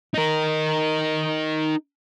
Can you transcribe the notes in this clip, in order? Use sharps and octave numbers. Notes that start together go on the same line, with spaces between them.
D#4 A#4